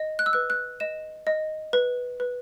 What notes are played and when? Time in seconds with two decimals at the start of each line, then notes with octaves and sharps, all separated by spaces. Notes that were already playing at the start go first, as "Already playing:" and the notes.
Already playing: D#5
0.19 F#6
0.26 E6
0.33 B4 F#6
0.50 F#6
0.80 D#5 E7
1.27 D#5
1.73 B4
2.20 B4